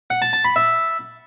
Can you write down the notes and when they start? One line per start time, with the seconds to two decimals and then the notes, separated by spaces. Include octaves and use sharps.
0.10 F#5
0.22 A5
0.33 A5
0.45 B5
0.56 E5